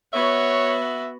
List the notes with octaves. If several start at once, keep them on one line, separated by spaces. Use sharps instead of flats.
B3 F#4 C#5 E5